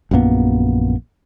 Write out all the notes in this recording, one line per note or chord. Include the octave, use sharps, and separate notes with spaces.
A#1 F#2 A#3 B3